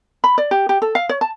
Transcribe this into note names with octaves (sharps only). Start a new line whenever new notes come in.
B5
D5
G4
G4
A4
F5
C#5
A5